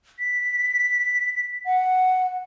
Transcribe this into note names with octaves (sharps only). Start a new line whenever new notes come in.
B6
F#5